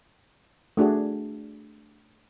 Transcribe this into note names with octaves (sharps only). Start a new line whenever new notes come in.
A3 D4 F#4 G#4